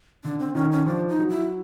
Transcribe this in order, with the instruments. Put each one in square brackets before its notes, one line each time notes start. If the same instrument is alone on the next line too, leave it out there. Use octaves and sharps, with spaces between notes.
[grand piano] D3 [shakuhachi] D4
[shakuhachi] C4
[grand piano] D#3 [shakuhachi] C#4
[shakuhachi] C#4
[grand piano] F3 [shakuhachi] D4
[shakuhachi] D#4
[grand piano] F#3
[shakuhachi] E4